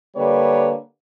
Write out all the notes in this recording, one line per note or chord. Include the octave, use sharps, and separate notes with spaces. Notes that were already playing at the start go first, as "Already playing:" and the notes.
D3 G3 A#3 B4 C#5